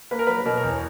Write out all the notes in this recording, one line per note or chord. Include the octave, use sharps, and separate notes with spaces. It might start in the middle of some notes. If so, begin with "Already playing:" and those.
A#3 B4
A#4
F#3 B4
B4
B2 A#4
A#4
E2
C#5